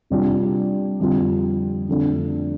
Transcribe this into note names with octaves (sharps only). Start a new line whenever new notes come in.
C3 G3 D4 F4
F2 D3 G3 F4
F2 D3 F3 A3 D4